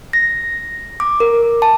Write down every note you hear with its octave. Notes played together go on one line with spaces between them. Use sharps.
A#6
D6
A#4
A5